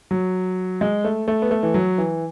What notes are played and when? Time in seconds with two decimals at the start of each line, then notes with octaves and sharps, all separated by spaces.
0.11 F#3
0.81 G#3
1.04 A3
1.28 A3
1.42 B3
1.51 A3
1.63 E3
1.74 F#3
1.98 E3